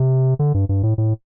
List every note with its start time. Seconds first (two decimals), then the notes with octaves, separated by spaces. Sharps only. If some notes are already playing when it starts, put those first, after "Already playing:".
Already playing: C3
0.39 D3
0.54 G2
0.69 G2
0.83 A2
0.98 A2